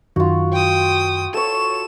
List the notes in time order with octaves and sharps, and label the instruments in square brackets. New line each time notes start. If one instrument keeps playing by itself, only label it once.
[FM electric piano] F#2 D#3 [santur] F4 F#4
[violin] G5 D#6
[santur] A4 C#5 [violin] E7